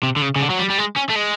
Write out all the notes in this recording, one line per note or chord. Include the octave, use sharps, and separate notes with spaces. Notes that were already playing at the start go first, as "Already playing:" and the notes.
C3
D3
C#3
C#3
D3
F#3
G3
G3
G#3
C#4
A3
G#3